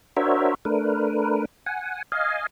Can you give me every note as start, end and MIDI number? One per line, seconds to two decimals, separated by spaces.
0.17 0.54 62
0.17 0.54 66
0.17 0.54 70
0.17 0.54 72
0.17 0.54 73
0.17 0.54 76
0.65 1.45 57
0.65 1.45 62
0.65 1.45 70
0.65 1.45 71
1.66 2.02 78
1.66 2.02 80
2.12 2.47 75
2.12 2.47 77
2.12 2.47 80